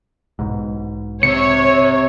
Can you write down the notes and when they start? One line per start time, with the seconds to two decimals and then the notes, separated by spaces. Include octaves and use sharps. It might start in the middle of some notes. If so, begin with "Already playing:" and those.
0.39 B1 G#2
1.23 C3 C4 C#5 C#7